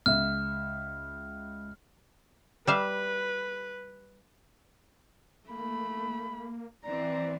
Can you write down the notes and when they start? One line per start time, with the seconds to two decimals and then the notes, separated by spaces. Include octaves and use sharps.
0.06 C#2 E5 F6
2.67 G3 B4 E5 F5
5.49 A3 A#3 B5
6.84 E3 C4 D5 A#5